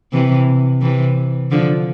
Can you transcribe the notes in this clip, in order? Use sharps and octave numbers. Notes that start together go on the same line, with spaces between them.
C3 E3
C3 E3
D3 F3